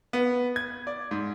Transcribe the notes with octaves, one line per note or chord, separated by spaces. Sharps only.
B3
G#6
D5
G#2